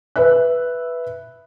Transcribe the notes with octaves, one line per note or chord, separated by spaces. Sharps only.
B4 E5 F#6